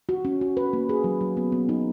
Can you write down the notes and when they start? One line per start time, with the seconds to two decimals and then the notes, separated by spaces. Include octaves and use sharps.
0.09 F#4
0.25 C#4
0.41 F#4
0.57 B4
0.73 A#3
0.89 G#4
1.04 F#3
1.21 F#3
1.37 B3
1.52 B3
1.69 D#4